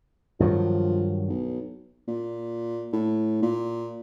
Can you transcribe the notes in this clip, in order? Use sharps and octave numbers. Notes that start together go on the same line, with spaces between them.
G2 D#3 F3 F#3
B1
A#2
A2
A#2